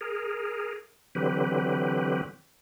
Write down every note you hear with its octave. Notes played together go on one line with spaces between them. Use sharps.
G#4 A#4
D3 E3 F#3 C4 G4 B4